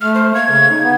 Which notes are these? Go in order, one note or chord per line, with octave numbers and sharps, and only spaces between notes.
A3 F6
C5
A#3 G#6
C#3
D#4
B3